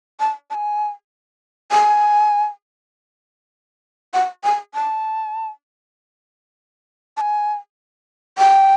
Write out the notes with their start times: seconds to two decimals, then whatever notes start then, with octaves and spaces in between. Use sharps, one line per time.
0.20 A5
0.50 A5
0.55 G#5
1.71 G#5
4.14 F#5
4.44 G#5
4.74 A5
7.17 A5
7.21 G#5
8.38 G5